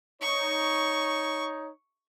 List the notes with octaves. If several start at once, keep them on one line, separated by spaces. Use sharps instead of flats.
D#4 C#5 C#6